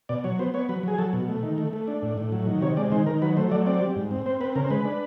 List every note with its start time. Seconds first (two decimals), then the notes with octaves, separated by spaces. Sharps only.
0.09 B2 D5
0.24 F#3 C#5
0.39 B3 C5
0.54 B3 C#5
0.69 F#3 B4
0.83 F#3 G#4
0.98 F#3 A4
1.13 B2
1.28 A3
1.43 D#3
1.58 A3
1.73 A3
1.88 D4
2.02 A2
2.18 A2
2.32 F#3
2.47 D#3
2.62 C3 C#5
2.77 G#3 D5
2.92 D#3 C5
3.06 D#3 A#4
3.22 F#3 B4
3.37 A3 C5
3.51 F#3 D5
3.66 C4 D5
3.81 G3
3.96 G#2
4.11 C4
4.26 C4 C5
4.41 C4 B4
4.56 C#3 A#4
4.64 C5
4.70 G#3 B4
4.85 D4